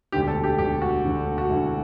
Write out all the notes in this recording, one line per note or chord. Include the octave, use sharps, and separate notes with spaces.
E1 D2 D3 G4
A4
G4
E1 D2 D3 G4
F#4
E1 D2 D3
F#4
E1 D2 D3 E4